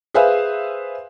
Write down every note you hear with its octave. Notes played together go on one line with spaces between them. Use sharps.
G#4 B4 C5 E5 F5